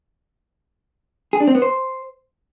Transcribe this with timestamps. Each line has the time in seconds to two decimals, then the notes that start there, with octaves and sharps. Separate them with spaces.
1.33 G#4
1.40 D4
1.48 C4
1.55 B3
1.62 C5